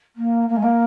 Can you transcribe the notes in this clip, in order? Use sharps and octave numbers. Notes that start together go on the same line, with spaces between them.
A#3
A#3
G#3
A#3